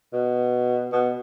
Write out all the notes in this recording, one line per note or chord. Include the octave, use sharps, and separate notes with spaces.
B2
B2